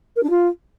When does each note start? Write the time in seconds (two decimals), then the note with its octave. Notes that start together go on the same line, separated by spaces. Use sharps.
0.16 A#4
0.23 D4
0.30 F4